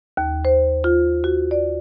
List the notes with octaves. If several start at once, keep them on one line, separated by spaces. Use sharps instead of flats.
D#2
C5
F4
F#4
D5